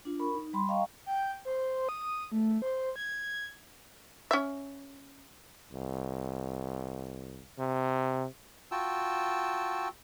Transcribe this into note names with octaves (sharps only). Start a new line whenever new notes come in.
D4 F4
A#4 B5 C#6
D#4
G3 B5 C6
D#5 F5 G5 A#5 C#6
G5
C5
D#6
A3
C5
G#6
C#4 E5
C2
C3
F4 F#4 G5 A5 E6